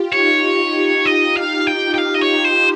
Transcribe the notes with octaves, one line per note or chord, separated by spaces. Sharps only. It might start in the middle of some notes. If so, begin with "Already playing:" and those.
Already playing: F4 G4
D#4 C#5
D#5
F5
G5
G5
F5
D#5
C#5
C5